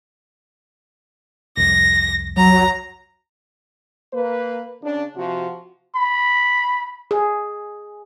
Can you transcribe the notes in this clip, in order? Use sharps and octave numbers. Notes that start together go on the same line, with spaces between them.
C2 F2 A#6
F#3 A#5
A#3 B4
C#3 D4
C3 F3 F#4
B5
G#4